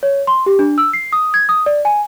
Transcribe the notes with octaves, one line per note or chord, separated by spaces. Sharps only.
C#5
C6
G4
D4
E6
C7
D#6
G#6
D#6
D5
G#5